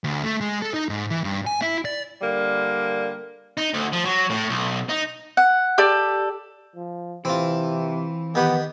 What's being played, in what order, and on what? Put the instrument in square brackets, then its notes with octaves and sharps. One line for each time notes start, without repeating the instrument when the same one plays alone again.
[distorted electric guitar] D2
A3
G#3
A4
D#4
G#2
E3
G2
G#5
E4
D5
[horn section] D3 G3 A#3
[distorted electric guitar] D#4
D2
F3
F#3
A2
B1
D#4
[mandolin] F#5
G4 A4 D5
[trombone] F3
[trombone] C3 [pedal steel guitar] E3 [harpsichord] C4 F4
[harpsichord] D#3 G4 B5 [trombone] B3